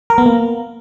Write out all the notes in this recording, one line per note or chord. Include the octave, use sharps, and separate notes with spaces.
A#4
B3
A#3